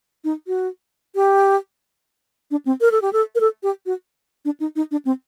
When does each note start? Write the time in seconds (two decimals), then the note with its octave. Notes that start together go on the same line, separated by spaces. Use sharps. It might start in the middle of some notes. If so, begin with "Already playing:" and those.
0.24 D#4
0.47 F#4
1.15 G4
2.51 D4
2.66 C4
2.81 A#4
2.92 A4
3.02 G4
3.13 A4
3.35 A#4
3.40 A4
3.63 G4
3.86 F#4
4.45 D4
4.60 D#4
4.76 D#4
4.91 D4
5.05 C4